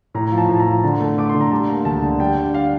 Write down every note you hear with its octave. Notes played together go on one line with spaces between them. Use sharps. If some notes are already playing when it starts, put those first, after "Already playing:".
A2 A#5
F3
A5
A2
A#5
F3
D3 A5
A3
A3 D6
C6
D3
A#5
G3 A5
A#3
D2 A5
D3
G3 G5
D4
D4 F5